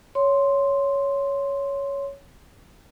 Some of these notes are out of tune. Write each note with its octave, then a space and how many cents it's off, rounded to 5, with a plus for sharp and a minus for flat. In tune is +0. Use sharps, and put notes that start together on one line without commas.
C#5 +10 C6 +0